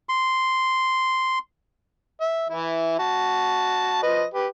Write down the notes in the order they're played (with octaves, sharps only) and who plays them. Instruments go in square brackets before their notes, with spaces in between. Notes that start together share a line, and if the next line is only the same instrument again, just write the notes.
[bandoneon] C6
[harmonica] E5
E3 E4
F#4 A5
F3 B4 D#5
G4 B4